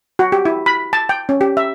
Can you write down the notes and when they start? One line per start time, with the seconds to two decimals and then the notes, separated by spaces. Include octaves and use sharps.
0.19 F#4
0.32 G4
0.45 E4
0.66 B5
0.93 A5
1.09 G5
1.29 C#4
1.41 G4
1.57 E5